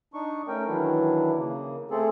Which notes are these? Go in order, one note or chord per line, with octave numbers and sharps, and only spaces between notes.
D4 D#4 C#6
A3 C#4 A#4 G5
D#3 E3 F#3 D4 E4
C#3 A#3
A3 C4 G#4 A4